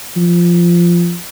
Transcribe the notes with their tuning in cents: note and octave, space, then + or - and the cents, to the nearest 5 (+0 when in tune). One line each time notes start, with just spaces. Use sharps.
F3 -10